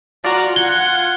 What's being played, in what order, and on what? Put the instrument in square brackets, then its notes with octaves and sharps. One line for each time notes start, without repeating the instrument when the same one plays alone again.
[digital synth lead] F4 [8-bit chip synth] F#4 D5 [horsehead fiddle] A#5
[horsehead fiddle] F#5 [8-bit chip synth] G#6 [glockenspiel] G7